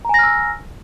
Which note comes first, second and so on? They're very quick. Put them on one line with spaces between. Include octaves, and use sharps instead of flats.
A#5 G#5 A#6 F6 E6